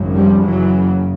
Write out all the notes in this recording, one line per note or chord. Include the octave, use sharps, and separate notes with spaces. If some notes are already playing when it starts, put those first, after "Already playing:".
Already playing: G#1 F#2 C#3
F3 G3
F#1 F#2 C#3 E3 F#3